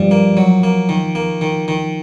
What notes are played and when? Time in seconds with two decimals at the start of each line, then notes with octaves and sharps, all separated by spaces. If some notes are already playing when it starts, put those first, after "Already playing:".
Already playing: G2 F3
0.11 A#3
0.37 F#3
0.63 A#3
0.89 D#3
1.15 A#3
1.41 D#3
1.68 D#3